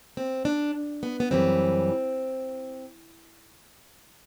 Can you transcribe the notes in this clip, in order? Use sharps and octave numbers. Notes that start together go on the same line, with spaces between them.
C4
D4
B3
B3
F#2 E3 G3 C4